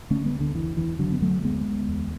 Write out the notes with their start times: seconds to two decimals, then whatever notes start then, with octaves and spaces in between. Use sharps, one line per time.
0.10 D3 A3 C#4
0.26 G#3 B3
0.33 D2
0.40 D3
0.55 F#1 E3
0.77 E2 E3
0.99 F#1 D3 F#3
1.12 B3
1.22 D3 F#3 A3
1.44 D2 G#3 B3
1.67 D2
1.88 E2